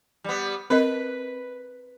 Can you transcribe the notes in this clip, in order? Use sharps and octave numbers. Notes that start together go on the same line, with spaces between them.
G3 B3
C4 A#4 B4 D#5